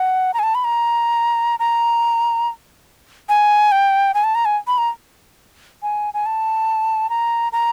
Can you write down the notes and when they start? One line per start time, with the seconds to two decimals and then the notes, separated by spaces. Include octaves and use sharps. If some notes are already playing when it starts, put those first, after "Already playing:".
Already playing: F#5
0.34 A#5
0.39 G#5
0.43 A5
0.55 B5
0.64 A#5
1.60 A#5
3.29 G#5
3.72 G5
4.14 G#5
4.24 A5
4.35 A#5
4.45 G#5
4.67 B5
4.78 A#5
5.83 G#5
6.14 G#5
6.26 A5
7.10 A#5
7.53 A#5